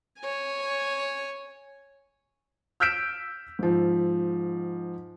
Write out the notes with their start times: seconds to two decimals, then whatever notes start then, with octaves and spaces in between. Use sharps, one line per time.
0.19 C#5 G#5
2.80 E6 F6 G6 B6 D7 E7
3.59 G#2 F3